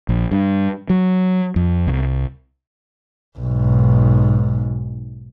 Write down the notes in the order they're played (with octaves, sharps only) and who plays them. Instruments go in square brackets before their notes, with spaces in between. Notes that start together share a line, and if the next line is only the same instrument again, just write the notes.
[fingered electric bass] A#1
G2
F#3
F2
C2
[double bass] B1 G#2